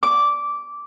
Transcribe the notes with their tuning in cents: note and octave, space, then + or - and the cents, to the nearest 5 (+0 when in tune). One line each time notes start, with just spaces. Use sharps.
D6 -10